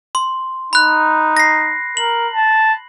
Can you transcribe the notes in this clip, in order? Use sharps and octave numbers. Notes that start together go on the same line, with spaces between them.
C6
D#4 B5 F#6
A#6 C7
A#4 F#7
A5